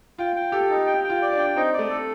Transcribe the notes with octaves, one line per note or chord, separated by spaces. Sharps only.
F4 G5
G5
G4 A4
D#4
G5
G5
F4
D5
D4
G5
C4 D#4
D5
A3
A4